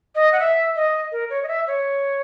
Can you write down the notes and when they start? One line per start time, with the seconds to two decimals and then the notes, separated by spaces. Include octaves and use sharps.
0.15 D#5
0.32 F#5
0.40 E5
0.76 D#5
1.12 A#4
1.30 C#5
1.43 D#5
1.48 E5
1.67 C#5